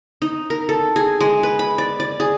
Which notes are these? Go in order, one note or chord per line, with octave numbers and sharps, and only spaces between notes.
D#4
A#4
A4
G#4
G#3
B4
B5
D5
D5
G#4